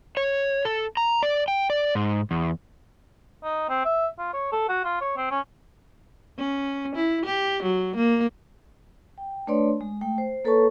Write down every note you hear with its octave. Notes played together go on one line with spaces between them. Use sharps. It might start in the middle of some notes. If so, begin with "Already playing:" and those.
C#5
A4
A#5
D5
G5
D5
G#2
E2
D#4
C4
E5
F4
C#5
A4
F#4
F4
C#5
C4
C#4
C#4
E4
G4
F#3
A#3
G5
A3 D4 B4 C#5 D5 C6
G#3
A3 G5
C5
A#3 A4 B4 C#5 A5 C#6